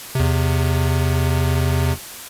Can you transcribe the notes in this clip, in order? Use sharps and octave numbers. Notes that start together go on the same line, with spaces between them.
E2 C3